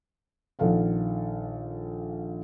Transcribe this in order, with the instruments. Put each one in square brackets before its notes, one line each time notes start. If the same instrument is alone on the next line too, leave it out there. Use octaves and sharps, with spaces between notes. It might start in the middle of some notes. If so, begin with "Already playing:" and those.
[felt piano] A#1 D#3 A4 F5 F#5